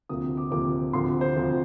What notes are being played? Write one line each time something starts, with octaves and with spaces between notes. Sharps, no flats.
D2 C3 F3 A#3 D#6
D6
D2 C3 F3 A#3 D6
D2 C3 F3 C6
C5
D2 C3 F3